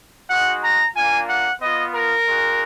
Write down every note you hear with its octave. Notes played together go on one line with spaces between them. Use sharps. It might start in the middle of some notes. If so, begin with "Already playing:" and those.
G#3 D#4 F#4 F#5
A#5
A#3 D4 F4 G#5
F#5
B3 F4 D#5
A#4
G#3 D#4 F#4